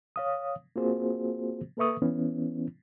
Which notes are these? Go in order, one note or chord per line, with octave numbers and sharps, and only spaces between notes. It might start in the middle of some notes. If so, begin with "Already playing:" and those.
C#5 F5 D#6
A#3 C4 F4 F#4 G#4 C5
A#3 A4 B4 E5 C#6 D#6
E3 B3 C#4 E4